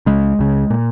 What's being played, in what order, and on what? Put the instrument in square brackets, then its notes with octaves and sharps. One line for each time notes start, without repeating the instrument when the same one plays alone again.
[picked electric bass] C#2 C#3 G#3
C#2 C#3
A#2